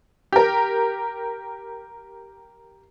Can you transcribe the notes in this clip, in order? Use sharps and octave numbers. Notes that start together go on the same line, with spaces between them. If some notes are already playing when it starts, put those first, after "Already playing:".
G4 A#4